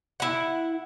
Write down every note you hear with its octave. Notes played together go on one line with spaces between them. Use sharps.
E4 F#5